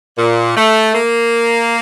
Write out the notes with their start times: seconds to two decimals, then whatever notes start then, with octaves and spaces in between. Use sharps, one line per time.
0.17 A#2
0.56 A3
0.93 A#3